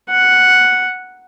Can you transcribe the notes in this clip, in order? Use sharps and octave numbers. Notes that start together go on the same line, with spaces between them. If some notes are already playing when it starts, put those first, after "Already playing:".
F#5